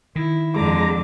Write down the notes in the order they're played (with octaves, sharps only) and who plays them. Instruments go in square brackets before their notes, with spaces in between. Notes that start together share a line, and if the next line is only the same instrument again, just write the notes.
[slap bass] D#3 [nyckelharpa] E4
[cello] F2 D3 [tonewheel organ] G#3 A#5 [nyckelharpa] D6